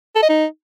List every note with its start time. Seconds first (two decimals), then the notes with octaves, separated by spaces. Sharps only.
0.16 A4
0.23 D#5
0.29 D#4